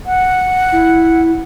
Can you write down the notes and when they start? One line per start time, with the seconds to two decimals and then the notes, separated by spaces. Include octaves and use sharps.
0.06 F#5
0.72 E4